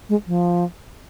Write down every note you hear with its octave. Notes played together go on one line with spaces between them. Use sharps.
G#3
F3